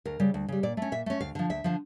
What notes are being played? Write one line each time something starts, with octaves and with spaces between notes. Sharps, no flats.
D2 A#4
C#3 G3
D2
C#3 G3
A#2 D5
A3 C#4
A#2 E5
A3 C#4
D2 F5
D3 F3
D2 E5
D3 F3